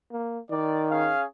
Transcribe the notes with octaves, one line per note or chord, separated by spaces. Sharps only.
A#3
D#3 D5
C#4 G#4 F5